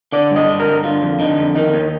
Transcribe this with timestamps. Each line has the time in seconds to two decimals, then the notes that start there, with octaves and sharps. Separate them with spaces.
0.12 D3 D5
0.31 G2
0.36 D#5
0.49 D3
0.60 A#4
0.66 G2
0.84 D3 F4
1.02 F2
1.20 D3 D#4
1.38 F2
1.55 D#3 D#4
1.73 D#2